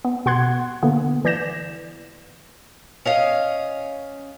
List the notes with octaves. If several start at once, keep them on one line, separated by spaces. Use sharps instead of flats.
B3
B2 B3 F#5 C6 F#6 G#6
D3 A#3 B3
E3 D5 G6 A#6 E7
C#4 D#5 F5